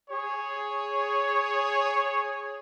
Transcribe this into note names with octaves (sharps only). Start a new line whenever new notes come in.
G#4 C#5